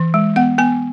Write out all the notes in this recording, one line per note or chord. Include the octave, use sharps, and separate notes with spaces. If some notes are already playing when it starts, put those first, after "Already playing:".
Already playing: E3
G#3
B3 F#5
B3 G#5